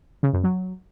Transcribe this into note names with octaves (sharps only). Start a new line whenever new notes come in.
C#3
F#2
F#3